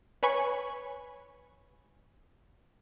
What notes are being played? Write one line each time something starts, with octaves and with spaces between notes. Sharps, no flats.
B4 C#5 G#5 B5 C#6